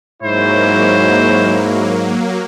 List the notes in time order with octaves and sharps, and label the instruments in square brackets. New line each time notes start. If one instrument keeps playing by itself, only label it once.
[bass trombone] G#2 [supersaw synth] F#3 A#3 [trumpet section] G#3 E4 C#5 [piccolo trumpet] C5